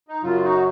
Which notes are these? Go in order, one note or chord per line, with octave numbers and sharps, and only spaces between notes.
D#4
F#2 C#3 F#3 F4
D#4 F#4